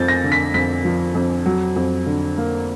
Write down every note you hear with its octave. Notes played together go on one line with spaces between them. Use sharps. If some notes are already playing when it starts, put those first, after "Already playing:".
Already playing: F2 F3 G6 A6
A#6
D3
B6
F2 B6
F3
F2
F#3
F2
D3
A#3